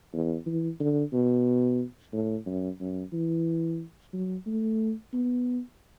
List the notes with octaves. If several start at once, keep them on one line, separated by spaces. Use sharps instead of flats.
E2
E3
D3
B2
A2
F#2
F#2
E3
F#3
A3
B3